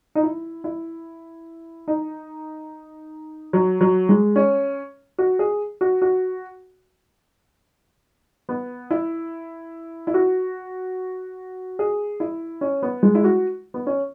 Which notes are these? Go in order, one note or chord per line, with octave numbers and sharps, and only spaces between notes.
D#4
E4
E4
D#4
F#3
F#3
G#3
C#4
F#4
G#4
F#4
F#4
B3
E4
E4
F#4
G#4
E4
C#4
B3
G#3
E4
F#4
B3
C#4